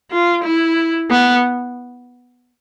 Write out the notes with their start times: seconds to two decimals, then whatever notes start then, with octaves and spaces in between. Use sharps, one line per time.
0.11 F4
0.44 E4
1.10 B3